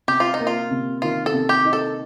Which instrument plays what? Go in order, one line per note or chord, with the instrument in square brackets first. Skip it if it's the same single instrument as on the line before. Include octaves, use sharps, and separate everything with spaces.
[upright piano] C3 [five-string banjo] G4
[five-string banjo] F4
D#4
[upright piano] A#3
[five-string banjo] F4
[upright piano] C3
[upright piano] D#3 [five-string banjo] F4
[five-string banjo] A4
[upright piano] C3
[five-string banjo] G4
[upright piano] D#4
[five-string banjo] A4